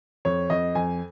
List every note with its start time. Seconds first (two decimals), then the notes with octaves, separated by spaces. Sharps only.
0.25 F2 C#5
0.50 F2 D#5
0.75 F2 G#5